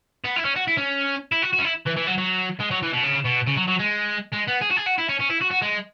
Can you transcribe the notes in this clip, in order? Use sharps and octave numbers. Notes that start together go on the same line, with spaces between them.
B3
E4
C#4
F#4
E4
C#4
E4
F#4
F#4
C#4
E4
E3
E3
F#3
F#3
G#3
F#3
E3
B2
C#3
B2
C#3
F#3
F#3
G#3
G#3
B3
G#4
F#4
G#4
F#4
E4
C#4
C#4
E4
F#4
F#4
G#3